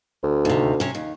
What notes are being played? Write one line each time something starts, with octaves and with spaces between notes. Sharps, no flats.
D2
D#2 C3
C3 C#4
D#2